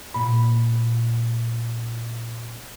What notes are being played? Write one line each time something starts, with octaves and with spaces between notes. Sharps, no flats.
A#2 B5